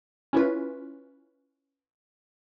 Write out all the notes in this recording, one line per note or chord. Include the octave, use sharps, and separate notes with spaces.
C#4 E4 F4 B4